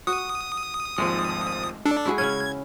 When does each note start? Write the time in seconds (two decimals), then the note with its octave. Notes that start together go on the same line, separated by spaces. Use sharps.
0.07 F#4 D#6
0.98 G#1 D#2 F3 G#3 A3
1.86 D4 A4
2.05 G#3 E4 F#4 G#4
2.18 C#3 C#4 G#6